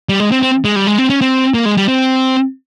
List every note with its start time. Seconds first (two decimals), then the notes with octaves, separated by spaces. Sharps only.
0.09 G3
0.20 G#3
0.31 C4
0.42 C4
0.65 G#3
0.76 G3
0.87 G#3
0.98 C4
1.10 C#4
1.21 C4
1.54 A#3
1.65 G#3
1.77 G3
1.88 C4